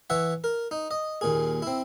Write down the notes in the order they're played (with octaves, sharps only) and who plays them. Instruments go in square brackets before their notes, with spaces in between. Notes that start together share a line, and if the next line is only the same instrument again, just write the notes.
[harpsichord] E3 C#5 E5 F#5
A#4
D#4
D#5
D#2 A#2 G#4
C4 E4